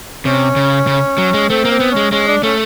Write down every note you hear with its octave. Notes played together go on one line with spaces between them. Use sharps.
C3 C#4
C#3
C#3
F#3
G#3
A3 C4
A#3
C4
B3
C#4
G#3
G#3 C#4
D4
A3 C#4